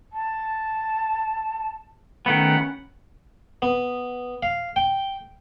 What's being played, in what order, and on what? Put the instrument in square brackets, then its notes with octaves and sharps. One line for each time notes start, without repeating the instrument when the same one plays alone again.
[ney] A5
[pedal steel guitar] D#3 A3 B3 [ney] C#4 [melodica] F#5 B5
[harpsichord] B3
F5
G5